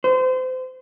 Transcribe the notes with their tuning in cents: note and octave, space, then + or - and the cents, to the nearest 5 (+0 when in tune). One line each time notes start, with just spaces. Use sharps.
C5 -30